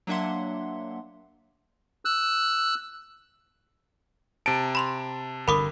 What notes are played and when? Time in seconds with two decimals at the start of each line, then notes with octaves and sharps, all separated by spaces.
0.07 F#3 A#3 D4 E5 F#5 C6
2.05 E6 F#6
4.46 C3 A5 D7
4.75 B5 C6 F7
5.48 G1 D3 A#4 B5 D6 D#6